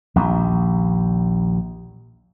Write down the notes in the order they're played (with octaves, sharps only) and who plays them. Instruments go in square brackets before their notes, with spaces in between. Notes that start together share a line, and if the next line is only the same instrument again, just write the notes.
[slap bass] A#1 D#2